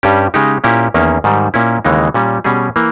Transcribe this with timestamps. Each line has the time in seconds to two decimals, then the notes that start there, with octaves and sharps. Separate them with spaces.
0.03 G2 G3 C#4 G4
0.34 C#3 G#3 D#4 G4
0.64 A#2 A#3 C#4 E4 G4
0.94 E2 D#3 A#3 C#4
1.24 G#2 D#3 G3
1.54 A#2 A#3 C#4 E4
1.85 D#2 C#3 E3 G#3 D#4
2.14 A#2 G3 C#4
2.44 B2 G3 C#4 G#4
2.76 E3 A#3